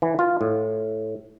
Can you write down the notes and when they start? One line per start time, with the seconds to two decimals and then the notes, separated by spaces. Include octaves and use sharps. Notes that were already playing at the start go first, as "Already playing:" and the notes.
0.02 E3
0.19 F4
0.41 A2